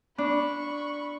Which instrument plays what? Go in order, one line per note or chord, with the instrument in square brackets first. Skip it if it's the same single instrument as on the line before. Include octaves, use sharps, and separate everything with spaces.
[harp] D4 [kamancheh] B5 C#6